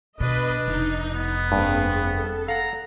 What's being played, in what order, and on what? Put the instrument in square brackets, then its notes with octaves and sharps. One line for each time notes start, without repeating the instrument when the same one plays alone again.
[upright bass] B2 [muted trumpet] D4 [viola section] B4 D#5
[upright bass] F1 [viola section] D#4
[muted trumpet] B3
[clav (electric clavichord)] G2 [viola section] A#3 C4 G#4
[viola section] A4
[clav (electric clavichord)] F5 F#5 [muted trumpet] A#5